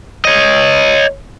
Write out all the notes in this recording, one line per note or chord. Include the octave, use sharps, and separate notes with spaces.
C#5 D#5